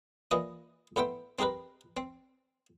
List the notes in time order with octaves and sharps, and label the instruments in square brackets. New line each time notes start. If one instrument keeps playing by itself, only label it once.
[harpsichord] A#2 E3 D#5 D#6
A2 B3 C5 E5 G5
C4 D#4 G4 A#4 B4
C4